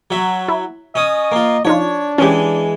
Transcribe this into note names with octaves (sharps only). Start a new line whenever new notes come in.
F#3 E5
E4
C#4 D#5 D#6
A#3 F4
F3 D4 D#4 F4 C#5
E3 G#3 C#4 G4